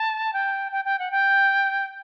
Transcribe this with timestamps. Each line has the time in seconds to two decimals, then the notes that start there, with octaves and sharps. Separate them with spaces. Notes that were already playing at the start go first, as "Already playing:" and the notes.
Already playing: A5
0.33 G5
0.72 G5
0.85 G5
0.99 F#5
1.11 G5